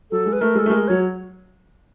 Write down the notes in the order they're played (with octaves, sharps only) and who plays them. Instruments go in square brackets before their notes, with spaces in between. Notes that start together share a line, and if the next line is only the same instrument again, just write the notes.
[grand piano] F#3 [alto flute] A4
[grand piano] G#3
[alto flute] B4
[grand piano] A3 [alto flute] A#4
[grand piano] G#3 [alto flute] A4
[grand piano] A3
[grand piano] G#3 [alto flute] A#4
[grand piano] F#3 [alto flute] C#5